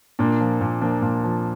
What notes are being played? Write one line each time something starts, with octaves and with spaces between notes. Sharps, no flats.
A#2 A#3 D4
F3
A#2
F3 A#3 D4
A#2
F3